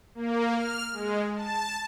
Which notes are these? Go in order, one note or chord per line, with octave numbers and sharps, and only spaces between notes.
A#3
F6
G#3
A5